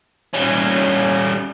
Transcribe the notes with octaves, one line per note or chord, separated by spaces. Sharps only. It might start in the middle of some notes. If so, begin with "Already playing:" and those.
G3 C#4